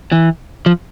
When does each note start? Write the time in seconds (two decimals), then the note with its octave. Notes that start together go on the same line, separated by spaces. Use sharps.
0.12 E3
0.66 F3